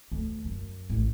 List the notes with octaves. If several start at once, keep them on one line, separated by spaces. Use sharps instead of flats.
D2
F#2
A1